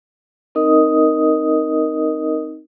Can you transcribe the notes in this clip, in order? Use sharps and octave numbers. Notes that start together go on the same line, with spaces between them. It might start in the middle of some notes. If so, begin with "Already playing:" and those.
C4 D#4 A#4 D#5 D#6